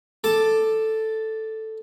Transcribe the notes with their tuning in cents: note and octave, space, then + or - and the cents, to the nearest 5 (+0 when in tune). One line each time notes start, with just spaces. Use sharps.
A4 +0 A5 +0 D6 +10